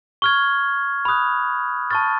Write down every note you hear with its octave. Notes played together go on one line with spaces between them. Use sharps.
C#6 F6 G#6
B5 D#6 F#6
A5 C#6 F6 A6